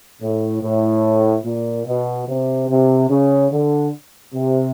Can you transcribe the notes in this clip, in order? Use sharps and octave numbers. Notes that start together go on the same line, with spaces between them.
A2
A2
A#2
B2
C3
C3
C#3
D3
C3